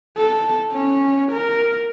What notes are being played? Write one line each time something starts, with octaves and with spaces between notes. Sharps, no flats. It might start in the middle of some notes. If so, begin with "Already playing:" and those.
A4
C#4
A#4